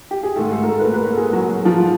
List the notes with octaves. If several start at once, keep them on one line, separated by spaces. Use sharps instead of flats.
G4
G#4
G#2 D#3 G#3 A3 A4
A3 A4
A#4
A3 A4
B4
A#3 A#4
B4
A#3 A#4
A4
G#3 G#4
F#3 F#4
F3 F4